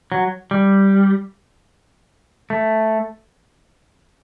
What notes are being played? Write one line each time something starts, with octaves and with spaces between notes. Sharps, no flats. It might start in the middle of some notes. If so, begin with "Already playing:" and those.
F#3
G3
A3